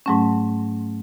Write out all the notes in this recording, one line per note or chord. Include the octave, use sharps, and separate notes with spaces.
G#2 F#3 A3 C#4